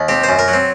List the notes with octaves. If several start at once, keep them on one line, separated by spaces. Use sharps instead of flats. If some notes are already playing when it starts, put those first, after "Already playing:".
Already playing: D#2
C4 G4
C5
F#2
A#4
F#3
C4